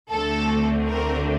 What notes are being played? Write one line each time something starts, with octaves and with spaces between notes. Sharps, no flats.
D2 D3 A3 C4 A4
A#4